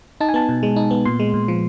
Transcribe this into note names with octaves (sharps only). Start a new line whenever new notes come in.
D#4 A5
G#5
B3 A5
B2
G#3
D#4
B3
A#2 C6
G#3
A#2
F3